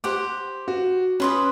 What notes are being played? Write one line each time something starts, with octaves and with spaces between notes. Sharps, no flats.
G4 C5 F#5 D6
F#4
C#4 B4 C6 D#6